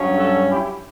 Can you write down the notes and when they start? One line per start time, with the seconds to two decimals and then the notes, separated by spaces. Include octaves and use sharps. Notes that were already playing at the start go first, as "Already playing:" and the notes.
Already playing: G2 F#3 C#4
0.16 F#4 A4
0.49 E4 G4